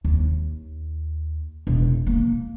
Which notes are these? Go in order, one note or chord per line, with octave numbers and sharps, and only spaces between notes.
D#2
E1
A#3